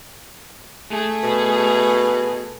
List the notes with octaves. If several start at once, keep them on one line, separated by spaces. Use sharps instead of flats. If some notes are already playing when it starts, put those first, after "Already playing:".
A3 G#4
B2